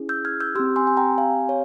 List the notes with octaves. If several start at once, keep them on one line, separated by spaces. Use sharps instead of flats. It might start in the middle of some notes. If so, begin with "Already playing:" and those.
Already playing: C#4 E4 G#4
E6 G6
F6 G#6
E6 G6
C4 G4 C6 E6
G#5 C6
G#5
G5 A#5
F5 G#5
C#5 F5